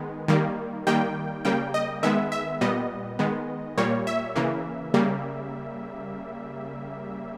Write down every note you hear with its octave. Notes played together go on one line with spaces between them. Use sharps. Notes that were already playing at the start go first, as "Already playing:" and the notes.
Already playing: D#3 G#3 B3
D#3 G3 A#3
D#3 G3 A#3 G5
C#3 G3 A#3 G5
D#5
D#3 G#3 B3 E5
E5
A#2 G3 B3 D#5
D#3 G#3 B3
A#2 G3 A#3 C#5
E5
C#3 E3 A#3
C#3 G3 A#3